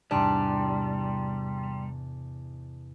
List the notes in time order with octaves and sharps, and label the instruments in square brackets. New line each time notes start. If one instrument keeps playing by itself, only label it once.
[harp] E2 G#2 C3 [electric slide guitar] G3 [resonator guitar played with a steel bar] D4 [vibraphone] G5 A#5 C6